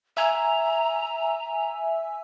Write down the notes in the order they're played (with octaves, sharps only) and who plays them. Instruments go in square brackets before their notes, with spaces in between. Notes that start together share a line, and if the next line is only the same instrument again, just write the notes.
[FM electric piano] E5 G#5 E6 [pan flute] A#5